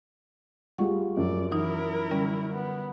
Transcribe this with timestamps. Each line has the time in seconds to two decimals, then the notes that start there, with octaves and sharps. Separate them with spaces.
0.78 G3 F4 G#4 F#5 C#6
1.17 F#2 F3 D5
1.52 E3 F#3 D#4 E4 A#4
2.11 D3 G3 C#4
2.53 B3